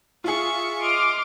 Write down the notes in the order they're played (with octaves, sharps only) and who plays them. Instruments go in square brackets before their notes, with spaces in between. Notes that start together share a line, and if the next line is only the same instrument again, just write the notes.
[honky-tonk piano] F4 G#4 [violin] E5 C#6
[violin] D#5 [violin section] C6 D6 F6